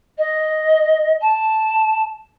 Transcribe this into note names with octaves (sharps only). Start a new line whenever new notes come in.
D#5
A5